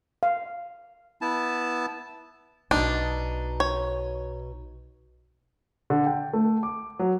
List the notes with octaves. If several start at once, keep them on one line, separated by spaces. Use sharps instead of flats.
F5
B3 E4 A5
B1 B2 D4 D#4
C#5
D3
G5
A3
D6
F#3